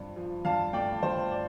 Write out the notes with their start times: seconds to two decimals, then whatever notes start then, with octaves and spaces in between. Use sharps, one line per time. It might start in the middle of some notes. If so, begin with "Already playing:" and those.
Already playing: G2 F3 C4
0.16 F3
0.45 G2 F5 A5
0.73 A3 D5 G5
1.03 G2 C5
1.31 D5